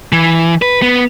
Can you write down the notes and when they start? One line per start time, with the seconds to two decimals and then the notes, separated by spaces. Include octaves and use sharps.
0.12 E3
0.62 B4
0.82 B3